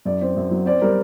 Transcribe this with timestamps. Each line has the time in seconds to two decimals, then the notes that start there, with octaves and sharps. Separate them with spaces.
0.05 F#2 D5
0.21 C4
0.37 F#2
0.51 F#3
0.66 C4 D5
0.82 G3 A#4